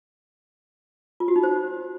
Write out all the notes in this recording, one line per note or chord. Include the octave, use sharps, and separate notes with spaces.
F4
F#4
D#4
C5